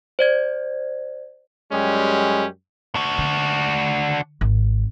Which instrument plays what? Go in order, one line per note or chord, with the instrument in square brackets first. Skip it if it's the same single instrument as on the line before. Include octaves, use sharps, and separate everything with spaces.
[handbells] C5 D5 G#6
[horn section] F#2 G3 G#3 C#4 G4
[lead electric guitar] D4 F#4
[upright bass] D3
G#1